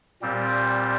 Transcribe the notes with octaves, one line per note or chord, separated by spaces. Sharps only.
A#2 G3 C4